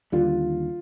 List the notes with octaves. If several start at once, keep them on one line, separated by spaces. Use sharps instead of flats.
D#2 D3 G3 F4